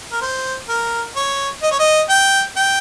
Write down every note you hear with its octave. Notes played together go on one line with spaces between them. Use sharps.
A#4
C5
A#4
C#5
D#5
C#5
D#5
G5
G5